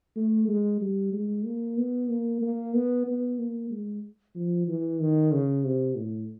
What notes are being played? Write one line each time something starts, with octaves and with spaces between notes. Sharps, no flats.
A3
G#3
G3
G#3
A#3
B3
A#3
A#3
B3
B3
A#3
G#3
F3
E3
D#3
C#3
C3
A2